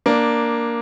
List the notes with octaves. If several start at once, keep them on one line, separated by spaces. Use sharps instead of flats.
A#3 D4